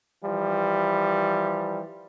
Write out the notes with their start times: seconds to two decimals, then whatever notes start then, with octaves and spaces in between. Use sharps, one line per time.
0.24 E3 F3 G3